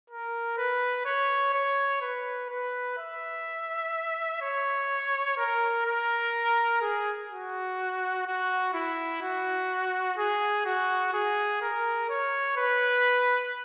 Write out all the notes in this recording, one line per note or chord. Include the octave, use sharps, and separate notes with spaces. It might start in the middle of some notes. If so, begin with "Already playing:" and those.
A#4
B4
C#5
C#5
B4
B4
E5
C#5
A#4
A#4
G#4
F#4
F#4
E4
F#4
G#4
F#4
G#4
A#4
C#5
B4